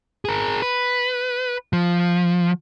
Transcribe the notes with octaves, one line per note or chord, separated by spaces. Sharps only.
G#4 A#4
B4
F3